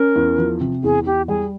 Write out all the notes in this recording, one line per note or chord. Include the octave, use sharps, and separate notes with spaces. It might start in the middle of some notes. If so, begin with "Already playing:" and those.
Already playing: C#4 A#4
E2
F3
C3
E2 G#4
E2 G4
G3 G#4